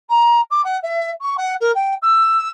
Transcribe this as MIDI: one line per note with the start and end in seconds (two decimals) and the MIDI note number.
0.09 0.41 82
0.50 0.61 86
0.64 0.77 78
0.83 1.11 76
1.21 1.37 85
1.37 1.54 78
1.60 1.71 70
1.75 1.95 79
2.02 2.49 88